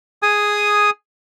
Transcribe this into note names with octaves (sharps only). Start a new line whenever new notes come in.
G#4 G#5 D#6